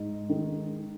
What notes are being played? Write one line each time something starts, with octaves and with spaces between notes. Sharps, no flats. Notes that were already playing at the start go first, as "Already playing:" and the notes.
Already playing: G#2 D#4
D#3 G#3